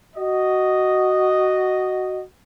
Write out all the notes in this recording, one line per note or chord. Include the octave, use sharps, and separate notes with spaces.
F#4 D#5